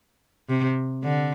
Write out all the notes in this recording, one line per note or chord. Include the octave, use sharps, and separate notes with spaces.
C3
D3